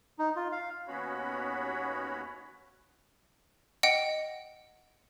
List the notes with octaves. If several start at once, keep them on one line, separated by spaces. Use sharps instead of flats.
D#4
F4
F5
D#2 B3 C#4 F#4 C#5 B5
D#5 F#5 G5